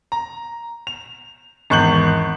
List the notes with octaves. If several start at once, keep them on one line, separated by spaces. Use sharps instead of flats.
A#5
F7
G#1 E2 C#6 F#6 G6 F#7